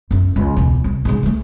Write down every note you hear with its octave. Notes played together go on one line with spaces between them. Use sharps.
F#2 E4
C#2
E2 B2
C2
G#2 C#3
E3 A3